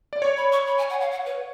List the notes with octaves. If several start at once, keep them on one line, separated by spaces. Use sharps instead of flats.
D5
C#5 C#6
B5
C#6
B5
G#5
F#5
F5
F#5
B4